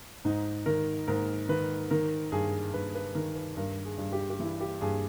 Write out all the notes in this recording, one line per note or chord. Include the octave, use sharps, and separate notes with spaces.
G#2 D#4
D#3 A#4
G#2 A#4
D#3 B4
D#3 A#4
G2 G#4
G2 B4
B4
D#3 A#4
B4
G2 A#4
G#4
G2
G4
G4
E3 E4
G4
G2 G#4